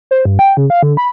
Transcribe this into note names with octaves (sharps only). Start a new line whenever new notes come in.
C5
G2
G5
C#3
F5
D3
B5